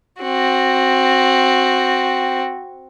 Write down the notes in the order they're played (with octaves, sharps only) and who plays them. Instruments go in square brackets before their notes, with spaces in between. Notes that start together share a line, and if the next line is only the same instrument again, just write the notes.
[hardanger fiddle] C4 F#4